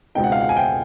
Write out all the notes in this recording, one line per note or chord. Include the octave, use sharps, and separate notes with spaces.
C#2 B2 G#3 C4 D#4 G5
F#5
F5
F#5
G#5
G5